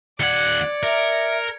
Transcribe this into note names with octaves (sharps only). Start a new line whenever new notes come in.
D#2 D5 F#5 G#6 C#7
A#4 E5